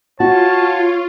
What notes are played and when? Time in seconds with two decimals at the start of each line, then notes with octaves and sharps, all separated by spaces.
0.20 F4 F#4 C#5 A5